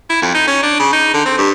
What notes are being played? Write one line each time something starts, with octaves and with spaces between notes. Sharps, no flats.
E4
F2
D#4
C#4
D4
C#3
D#4
D3
C4
G2